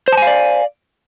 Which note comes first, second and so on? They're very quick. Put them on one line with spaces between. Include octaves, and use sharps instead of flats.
C5 A5 G#5 F5 D5